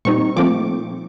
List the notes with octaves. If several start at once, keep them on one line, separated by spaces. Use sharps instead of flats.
A#2 G3 C4 D#4 C#6
A#2 F3 A3 C4 D6